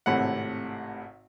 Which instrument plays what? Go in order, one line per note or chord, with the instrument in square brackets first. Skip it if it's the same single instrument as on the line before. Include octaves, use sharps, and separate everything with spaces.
[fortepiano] G#1 A2 C3 F#5